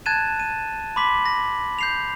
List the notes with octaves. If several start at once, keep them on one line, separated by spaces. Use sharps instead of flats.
A5 F#6 G#6 A6 D#7 E7
D#7
B5 C6 D6 B6 F#7
A#6
G6 C7 F7